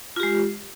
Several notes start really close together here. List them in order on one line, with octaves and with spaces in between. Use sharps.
F4 G4 G#3